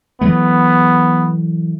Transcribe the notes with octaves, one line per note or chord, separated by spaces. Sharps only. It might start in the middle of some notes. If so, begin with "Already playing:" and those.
E3 F#3 A3 B3